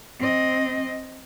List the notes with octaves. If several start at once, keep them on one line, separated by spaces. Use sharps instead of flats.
C4 D#5